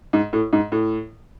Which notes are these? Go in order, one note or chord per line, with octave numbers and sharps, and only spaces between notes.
G#2
A2
G#2
A2